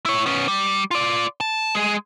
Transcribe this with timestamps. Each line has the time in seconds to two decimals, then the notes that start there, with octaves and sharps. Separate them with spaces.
0.06 E4 C#5
0.26 B3 C#4
0.48 G3
0.91 F4 D5
1.40 A5
1.75 G#3 G#4